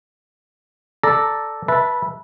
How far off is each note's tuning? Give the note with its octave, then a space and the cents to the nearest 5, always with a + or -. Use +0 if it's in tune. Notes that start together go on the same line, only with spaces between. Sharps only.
A4 +0 D5 +0 A#5 +0
B4 -20 E5 +0 A5 +0